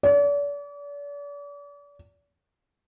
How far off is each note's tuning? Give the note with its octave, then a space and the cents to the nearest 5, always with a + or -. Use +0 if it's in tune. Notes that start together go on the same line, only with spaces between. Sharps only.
D5 -40